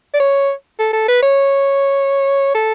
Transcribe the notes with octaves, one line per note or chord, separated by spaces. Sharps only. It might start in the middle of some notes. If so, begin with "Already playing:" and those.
D5
C#5
A4
A4
B4
C#5
A4